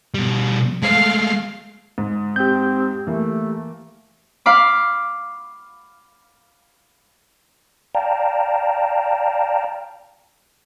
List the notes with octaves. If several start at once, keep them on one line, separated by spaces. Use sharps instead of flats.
B2 G3
G#3 A3 F5
G#2
C4 G4 G6
E3 A3 A#3
F5 B5 D6
D5 F5 G5 A5 A#5